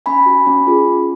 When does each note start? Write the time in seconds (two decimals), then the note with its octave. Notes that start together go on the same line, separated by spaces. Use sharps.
0.06 C#4 G#5 B5
0.26 F#4
0.47 C#4
0.67 F4 G#4
0.88 C#4